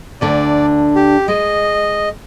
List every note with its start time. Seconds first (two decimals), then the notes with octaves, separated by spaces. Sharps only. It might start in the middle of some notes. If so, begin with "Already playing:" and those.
0.21 D2 D3 D4 D5
0.95 G4
1.28 G#3 D#5